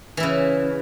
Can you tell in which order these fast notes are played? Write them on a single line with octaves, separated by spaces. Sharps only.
E3 E4 C#3